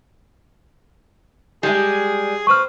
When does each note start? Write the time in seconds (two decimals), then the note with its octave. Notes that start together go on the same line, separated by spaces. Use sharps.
1.63 G3 G#3 G#4
2.47 C4 B4 C#6 F6